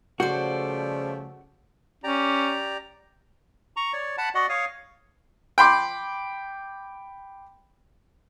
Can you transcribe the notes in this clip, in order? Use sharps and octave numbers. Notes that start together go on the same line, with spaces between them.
C#3 F3 G3 A3 F#4 C5 D5
C#4 G4 D5 A#5
A#5 C#6
C#5 D5
F#5 A5 B5
F#4 D5 D#5 F#5
C#5 F5 D#6
G5 B5 C6 D6